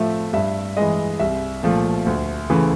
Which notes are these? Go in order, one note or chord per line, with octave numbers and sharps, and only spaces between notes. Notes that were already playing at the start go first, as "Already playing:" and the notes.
Already playing: A2 F3 A3 E5
G2 E5
E3 G#3 D#5
C2 E5
A#2 F3 A3
D2
C#3 E3 A3